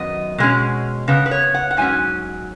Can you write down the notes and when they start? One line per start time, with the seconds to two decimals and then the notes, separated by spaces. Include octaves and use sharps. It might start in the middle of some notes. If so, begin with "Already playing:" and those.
Already playing: F#2 D#3 B3 D#5
0.38 B2 G#3 C#4
1.08 C#3 B3
1.26 B4
1.31 C#5
1.54 F#5
1.71 F#5
1.77 G#2 F#3 C#4 G#5